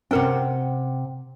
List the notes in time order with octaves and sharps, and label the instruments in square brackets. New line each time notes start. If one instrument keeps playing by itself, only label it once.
[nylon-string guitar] C3 F#5 G5 [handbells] C4 C#4 A#4